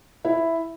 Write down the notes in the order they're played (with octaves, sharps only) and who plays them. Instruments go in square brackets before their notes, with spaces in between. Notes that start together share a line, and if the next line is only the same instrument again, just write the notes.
[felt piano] E4